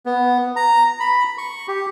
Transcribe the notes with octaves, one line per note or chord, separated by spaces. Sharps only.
B3
A#5
B5
C#6
G4